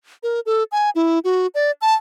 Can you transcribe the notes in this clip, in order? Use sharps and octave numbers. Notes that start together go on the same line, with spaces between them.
A#4
A4
G#5
E4
F#4
D5
A5